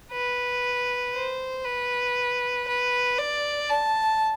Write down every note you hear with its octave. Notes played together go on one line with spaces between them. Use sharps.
B4
C5
B4
B4
D5
A5